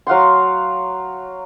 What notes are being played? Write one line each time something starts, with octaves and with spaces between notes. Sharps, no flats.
F#3 F5 F#5 C6